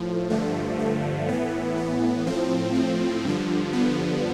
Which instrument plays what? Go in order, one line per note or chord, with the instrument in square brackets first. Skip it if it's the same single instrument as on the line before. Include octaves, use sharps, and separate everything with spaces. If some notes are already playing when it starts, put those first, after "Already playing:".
Already playing: [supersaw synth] A2 F3
G2 D3 F3 A3
A3
A2 E3 B3
B3
A2 F3 C4
F3
G2 D3 F3
B3